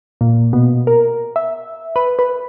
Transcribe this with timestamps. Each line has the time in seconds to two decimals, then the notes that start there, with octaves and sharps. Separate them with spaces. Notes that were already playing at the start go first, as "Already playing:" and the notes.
0.21 A#2
0.53 B2
0.87 A#4
1.36 E5
1.96 B4
2.19 B4